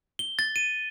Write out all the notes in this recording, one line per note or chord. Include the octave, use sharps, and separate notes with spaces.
G7
A6
D#7